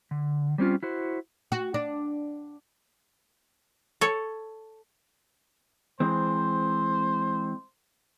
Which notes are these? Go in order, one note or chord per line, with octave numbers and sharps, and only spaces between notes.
D3
G3 C4 C#4 F4
E4 F#4 C5
F#4
D4
A4 C#5
E3 G#3 C4 C5